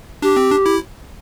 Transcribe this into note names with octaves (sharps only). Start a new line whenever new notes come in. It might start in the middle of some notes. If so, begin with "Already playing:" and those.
D4 G4
C4
D4
E4